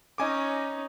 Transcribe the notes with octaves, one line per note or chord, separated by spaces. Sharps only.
C#4 D#4 D#5 G#5 D6